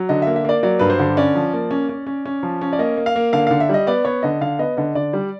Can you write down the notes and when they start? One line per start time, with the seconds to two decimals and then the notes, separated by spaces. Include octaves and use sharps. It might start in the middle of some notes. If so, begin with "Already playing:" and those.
Already playing: F#3
0.09 D3 D#5
0.22 A#3 E5
0.36 E5
0.44 A#3 D5
0.63 F#3 D5
0.79 G2 B4
0.90 C5
0.99 D3
1.17 C#4 D5
1.35 F3
1.53 A#3
1.71 C#4
1.89 C#4
2.07 C#4
2.26 C#4
2.43 F3
2.61 C#4
2.73 D5
2.79 A#3 D#5
2.97 A#3
3.06 F5
3.16 A#3
3.33 D3 F5
3.47 D3 F5
3.60 E5
3.69 G3 D#5
3.87 B3 D5
4.05 B3 C#5
4.23 D3 D#5
4.41 D3 F5
4.59 B3 D#5
4.77 D3 D#5
4.95 D3 D5
5.13 G3